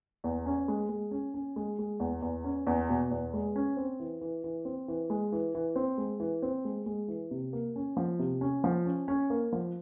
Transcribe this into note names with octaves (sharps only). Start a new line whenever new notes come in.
E2
C#4
G#3
G#3
C#4
C#4
G#3
G#3
E2
E2
C#4
E2
B2
E2
G#3
C#4
C4
E3
E3
E3
C4
E3
G#3
E3
E3
C4
G#3
E3
C4
G#3
G#3
E3
C3
A#3
C#4
F3
C3
C#4
F3
C#4
C#4
A#3
F3